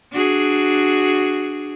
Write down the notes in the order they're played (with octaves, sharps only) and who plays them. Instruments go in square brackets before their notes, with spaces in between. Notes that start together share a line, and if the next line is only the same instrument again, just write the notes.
[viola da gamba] D4 F#4 G#4